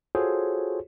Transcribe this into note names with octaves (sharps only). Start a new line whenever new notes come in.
F4 F#4 G#4 A4 C5 C#5